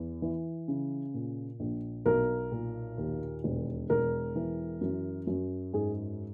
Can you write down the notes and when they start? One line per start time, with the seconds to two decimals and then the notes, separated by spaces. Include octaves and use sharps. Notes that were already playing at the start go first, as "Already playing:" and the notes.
Already playing: E2
0.22 E3
0.68 C#3
1.14 A#2
1.60 A#1
2.06 B1 A#4
2.51 A#2
2.98 D#2
3.44 E1
3.90 E1 A#4
4.36 E3
4.81 F#2
5.27 F#2
5.73 G#2 G#4